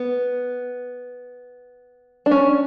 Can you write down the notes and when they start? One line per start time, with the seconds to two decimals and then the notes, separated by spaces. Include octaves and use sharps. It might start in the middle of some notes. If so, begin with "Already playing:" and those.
Already playing: B3
2.26 D4
2.31 C#4